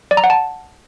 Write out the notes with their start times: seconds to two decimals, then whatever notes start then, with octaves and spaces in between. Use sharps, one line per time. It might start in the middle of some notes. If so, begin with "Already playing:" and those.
0.11 D5
0.17 A#5
0.24 F#5
0.30 A5